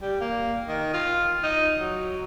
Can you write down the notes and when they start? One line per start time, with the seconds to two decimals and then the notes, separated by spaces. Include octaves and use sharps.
0.02 G3
0.21 A#3
0.68 D#3
0.93 F4
1.43 D#4
1.78 F#3